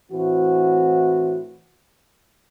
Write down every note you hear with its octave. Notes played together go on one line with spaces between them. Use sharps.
A2 E3 C4 F#4